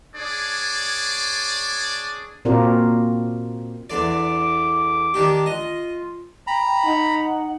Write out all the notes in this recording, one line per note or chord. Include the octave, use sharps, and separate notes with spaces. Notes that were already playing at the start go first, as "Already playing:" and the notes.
D4 G#4 C#5 D5
A#2 C4 F4 F#4 A#4 D5
E2 D3 D5
D6
D#3 D4 G4
F4 D#5
G5 A#5 B5
D#4 F#5